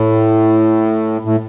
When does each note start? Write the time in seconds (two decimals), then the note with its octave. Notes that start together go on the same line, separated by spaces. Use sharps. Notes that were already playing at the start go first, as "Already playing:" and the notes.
Already playing: A2
1.25 A2